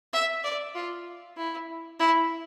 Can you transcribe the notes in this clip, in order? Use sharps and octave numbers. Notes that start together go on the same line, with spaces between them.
E5
D5
F4
E4
E4